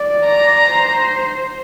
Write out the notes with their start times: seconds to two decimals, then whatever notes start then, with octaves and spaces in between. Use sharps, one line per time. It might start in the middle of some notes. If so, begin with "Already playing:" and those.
Already playing: D5
0.27 A#5
0.69 C5